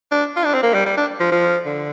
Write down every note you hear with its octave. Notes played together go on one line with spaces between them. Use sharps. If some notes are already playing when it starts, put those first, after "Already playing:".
D4
F4
D4
C4
A#3
G3
G3
D4
F3
F3
D3